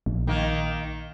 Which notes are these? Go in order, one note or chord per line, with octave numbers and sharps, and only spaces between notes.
A#1
D#3 A#3